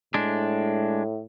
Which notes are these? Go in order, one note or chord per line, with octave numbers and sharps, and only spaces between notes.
A2 G#3 D4